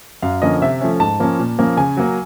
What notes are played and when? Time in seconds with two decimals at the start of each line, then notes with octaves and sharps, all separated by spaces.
0.22 F#2 F5
0.42 D3 F3 A#3 C#4 D#5
0.62 C3 E5
0.81 F3 A3 C#4
1.00 G#2 A5
1.20 F3 A#3 C#4
1.39 A#2
1.59 F3 A#3 C#4
1.77 C#3 G#5
1.97 F#3 A#3